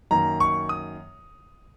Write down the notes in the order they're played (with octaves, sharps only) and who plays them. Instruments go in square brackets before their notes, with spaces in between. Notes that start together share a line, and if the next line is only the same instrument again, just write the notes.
[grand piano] F#2 D#3 A#3 A#5
C#6
D#6